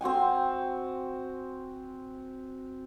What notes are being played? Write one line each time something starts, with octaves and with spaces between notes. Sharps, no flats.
C4 F#4 G5 G#5